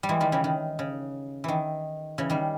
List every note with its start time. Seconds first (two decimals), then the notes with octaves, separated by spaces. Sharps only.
0.03 G3
0.09 E3 G#3
0.20 D#3 G3
0.32 C#3 E3
0.44 D#3
0.79 C#3
1.44 D#3 E3
2.18 C#3 E3
2.30 D#3 G3